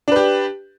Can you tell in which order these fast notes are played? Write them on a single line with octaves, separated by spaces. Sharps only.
D4 B4 G4